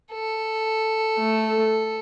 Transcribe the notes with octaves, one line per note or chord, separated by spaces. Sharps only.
A4
A3